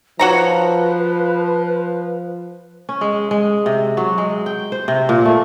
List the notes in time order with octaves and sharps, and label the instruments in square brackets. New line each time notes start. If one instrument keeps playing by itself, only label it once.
[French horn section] F3 [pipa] F#4 C#5 A#5 [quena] B4
[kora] C#4
G#3
G#3
C3
F#3
G#3
G5
C5
C3
A#2
A3